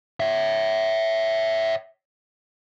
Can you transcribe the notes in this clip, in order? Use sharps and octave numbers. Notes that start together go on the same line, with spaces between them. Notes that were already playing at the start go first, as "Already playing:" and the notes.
C#5 E5